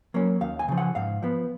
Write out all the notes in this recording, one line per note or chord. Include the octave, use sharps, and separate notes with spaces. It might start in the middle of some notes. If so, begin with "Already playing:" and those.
F#3 A#3 C#4
D#2 F5
G#5
C#3 F3
F#5
G#2 F5
F3 B3